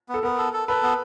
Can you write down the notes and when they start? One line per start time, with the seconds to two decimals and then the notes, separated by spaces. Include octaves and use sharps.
0.09 B3
0.14 A4
0.23 B3 A#4
0.38 A4
0.53 A4
0.68 A4 B4
0.83 B3